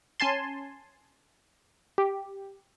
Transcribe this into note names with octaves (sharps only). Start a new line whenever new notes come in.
C#4 G#5 A5 C6
G4